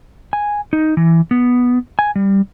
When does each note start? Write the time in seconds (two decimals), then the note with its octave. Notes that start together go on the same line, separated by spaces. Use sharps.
0.33 G#5
0.73 D#4
0.97 E3
1.31 B3
1.99 G#5
2.16 G3